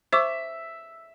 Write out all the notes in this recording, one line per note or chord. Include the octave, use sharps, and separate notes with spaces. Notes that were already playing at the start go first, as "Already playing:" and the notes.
C5 E5 C#6 D6